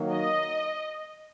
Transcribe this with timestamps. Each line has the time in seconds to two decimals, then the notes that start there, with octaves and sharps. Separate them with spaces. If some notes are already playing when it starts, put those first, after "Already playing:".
Already playing: D#3 F#3 A#3
0.13 D#5